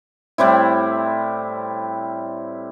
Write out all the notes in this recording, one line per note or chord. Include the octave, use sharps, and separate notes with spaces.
A2 G3 C4 E4